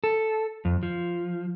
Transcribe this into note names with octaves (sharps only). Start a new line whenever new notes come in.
A4
F2
F3